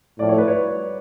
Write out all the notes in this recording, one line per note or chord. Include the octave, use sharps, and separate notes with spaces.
A2 F3 A3 D5
C#5
B4
C#5